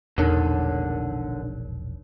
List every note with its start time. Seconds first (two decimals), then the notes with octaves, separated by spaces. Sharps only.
0.18 E1 A#1 E2 A2 D3 D#4 A#4 C#5